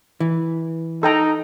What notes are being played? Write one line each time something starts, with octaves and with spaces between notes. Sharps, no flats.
E3
D#4 A4 G5 A#5